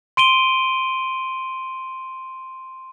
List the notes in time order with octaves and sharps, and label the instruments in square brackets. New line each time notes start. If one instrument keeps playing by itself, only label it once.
[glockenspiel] C6 D7 D#7 G7